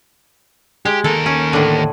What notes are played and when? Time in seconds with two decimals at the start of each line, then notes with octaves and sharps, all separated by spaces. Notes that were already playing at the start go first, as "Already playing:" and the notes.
0.85 G#3 G4
1.04 D#2 A4 A#4
1.26 C#4
1.53 A2 D3